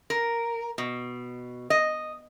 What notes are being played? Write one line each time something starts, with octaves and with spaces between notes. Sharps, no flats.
A#4
B2
D#5